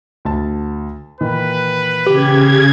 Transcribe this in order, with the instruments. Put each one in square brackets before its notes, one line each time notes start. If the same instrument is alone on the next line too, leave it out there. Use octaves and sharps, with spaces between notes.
[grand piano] D2 A5
[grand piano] A#2 D#3 E3 [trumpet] B4
[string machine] C#3 G#6 [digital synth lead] G4